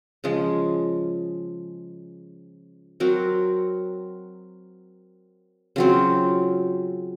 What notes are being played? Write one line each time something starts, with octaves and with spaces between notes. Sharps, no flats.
C#3 F3 G#3
F#3 C4 F#4 A#4
C#3 F#3 C4 F4